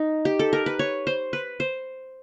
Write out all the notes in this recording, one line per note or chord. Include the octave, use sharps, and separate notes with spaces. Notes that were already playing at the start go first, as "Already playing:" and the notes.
Already playing: D#4
G4
A4
A#4
B4
C#5
C5
B4
C5